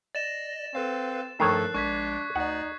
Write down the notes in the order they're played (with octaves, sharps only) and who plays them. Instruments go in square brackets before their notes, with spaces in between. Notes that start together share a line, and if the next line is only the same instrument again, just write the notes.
[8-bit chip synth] D5 D#5 A#6 [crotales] A6 E7
[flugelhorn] C4 [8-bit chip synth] A4 B4 F5
[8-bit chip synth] G2 F3 A3 [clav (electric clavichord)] D#3 C#5 [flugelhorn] A4 [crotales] F#6 C7
[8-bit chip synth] A#1 G#3 [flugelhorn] D4 [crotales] C#6 G#6 B6
[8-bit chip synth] D2 D5 [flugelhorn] D#4 [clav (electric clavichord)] F#5